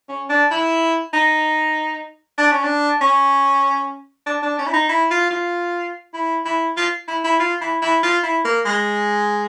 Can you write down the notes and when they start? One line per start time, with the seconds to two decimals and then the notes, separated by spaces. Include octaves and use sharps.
0.09 C#4
0.29 D4
0.51 E4
1.13 D#4
2.38 D4
2.51 C#4
2.63 D4
3.01 C#4
4.26 D4
4.42 D4
4.58 C#4
4.66 E4
4.73 D#4
4.89 E4
5.11 F4
5.31 F4
6.14 E4
6.45 E4
6.77 F4
7.08 E4
7.24 E4
7.39 F4
7.61 E4
7.82 E4
8.03 F4
8.23 E4
8.45 A#3
8.66 G#3